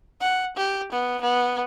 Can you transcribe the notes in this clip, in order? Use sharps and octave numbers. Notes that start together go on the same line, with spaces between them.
F#5
G4
B3
B3